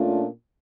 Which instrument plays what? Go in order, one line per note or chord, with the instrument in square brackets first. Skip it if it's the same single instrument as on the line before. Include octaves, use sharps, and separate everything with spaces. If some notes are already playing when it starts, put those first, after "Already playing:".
Already playing: [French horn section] A#2 A3 C#4 D4 F4